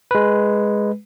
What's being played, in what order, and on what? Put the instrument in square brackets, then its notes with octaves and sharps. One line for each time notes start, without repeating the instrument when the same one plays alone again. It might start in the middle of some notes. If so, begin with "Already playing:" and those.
[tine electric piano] G#3 B4